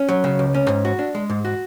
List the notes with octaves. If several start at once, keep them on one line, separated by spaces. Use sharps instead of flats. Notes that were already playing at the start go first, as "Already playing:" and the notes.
Already playing: C#4
F#3
C#3
C#2
C#4
G#2
F#4
D4
G#3
G#2
F#4